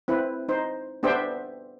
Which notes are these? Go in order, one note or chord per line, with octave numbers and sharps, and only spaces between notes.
C4 E4 B4
D#4 C5
B3 D4 G4 C5 E5 G5